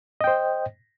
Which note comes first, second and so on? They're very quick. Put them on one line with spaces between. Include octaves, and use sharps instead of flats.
D#5 G5 C5